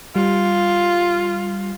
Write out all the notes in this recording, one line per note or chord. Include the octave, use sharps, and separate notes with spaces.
G3 F4